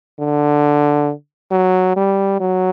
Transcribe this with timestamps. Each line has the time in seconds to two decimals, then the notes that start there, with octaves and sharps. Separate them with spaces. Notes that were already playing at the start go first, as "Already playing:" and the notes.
0.19 D3
1.51 F#3
1.96 G3
2.40 F#3